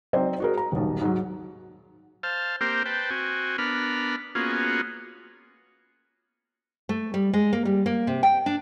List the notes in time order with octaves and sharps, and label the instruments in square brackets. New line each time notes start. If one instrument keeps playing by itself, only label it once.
[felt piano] F#3 C4 D#4 C5 D5
F#4 G#4 A#4
A#5
D#1 B1
G#2 F#3
[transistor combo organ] C5 F5 A5
A#3 C4 G4 A#4 C5
B4 C5 G5 A5
C4 F#4 G#5
B3 D4 A#4 B5 F6
A#3 B3 C#4 F4 F#4 G#4
[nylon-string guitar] A3
G3
G#3
A#3
G3
A#3
C3
G5
D4